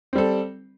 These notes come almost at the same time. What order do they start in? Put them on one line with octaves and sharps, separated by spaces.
C4 G3 A4